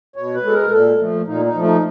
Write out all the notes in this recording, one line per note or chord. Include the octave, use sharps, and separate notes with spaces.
B2 C#5
B4
G#3 A4
A#4
A#2 A4
F3 A3
A#2 D#4
D#4
F3 A3
D#4